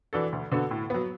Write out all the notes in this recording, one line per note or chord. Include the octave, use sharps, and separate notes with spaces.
E3 D4 F#4 A4
D2
D3 B3 F#4 A4
A2
F#3 B3